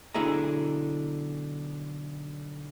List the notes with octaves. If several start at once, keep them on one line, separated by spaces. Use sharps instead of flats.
B1 D3 E4 G#4 D#5 A#5